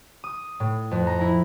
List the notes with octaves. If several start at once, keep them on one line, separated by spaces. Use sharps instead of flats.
D#6
A2
F2
A#5
E4